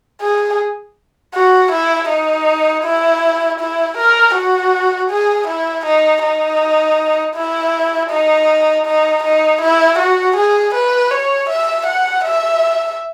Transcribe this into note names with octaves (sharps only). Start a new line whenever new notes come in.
G#4
F#4
E4
D#4
E4
E4
A#4
F#4
G#4
E4
D#4
D#4
E4
D#4
D#4
D#4
E4
F#4
G#4
B4
C#5
E5
F#5
E5